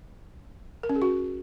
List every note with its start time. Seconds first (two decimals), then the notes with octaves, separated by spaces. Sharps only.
0.83 A#4
0.89 C#4
0.96 G#4
1.02 F#4